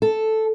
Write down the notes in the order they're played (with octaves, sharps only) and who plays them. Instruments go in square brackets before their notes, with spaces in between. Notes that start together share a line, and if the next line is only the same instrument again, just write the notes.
[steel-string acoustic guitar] A4